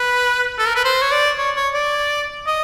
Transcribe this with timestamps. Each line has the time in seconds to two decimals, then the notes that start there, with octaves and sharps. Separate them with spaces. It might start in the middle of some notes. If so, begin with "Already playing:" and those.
Already playing: B4
0.59 A4
0.67 A#4
0.76 B4
0.84 C5
1.02 C#5
1.12 D5
1.38 C#5
1.56 C#5
1.74 D5
2.47 D#5